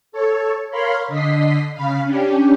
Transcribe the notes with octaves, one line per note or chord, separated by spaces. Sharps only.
A4 C#5
A#4 C#5 F5 B5 C6
D3 D#5 B6 C7
C#3 F5 B5
C#4 D4 G4